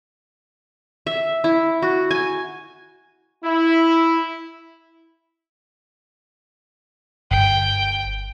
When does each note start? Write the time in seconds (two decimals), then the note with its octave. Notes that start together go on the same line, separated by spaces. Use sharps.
1.07 E5
1.44 E4
1.82 F#4
2.11 G#5
3.44 E4
7.31 G1 G5